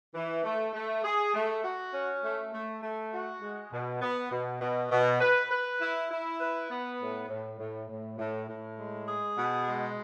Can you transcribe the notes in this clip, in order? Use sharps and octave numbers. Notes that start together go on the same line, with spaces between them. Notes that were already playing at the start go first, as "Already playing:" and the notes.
E3
A3
A3
G#4
A3
F#4
C#4
A3
A3
A3
F#4
G#3
B2
B3
B2
B2
B2
B4
B4
E4
E4
B4
B3
A2
A2
A2
A2
A2
A2
G#3
G#4
B2
G#3